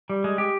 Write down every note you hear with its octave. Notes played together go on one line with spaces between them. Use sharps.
G3
G#3
G4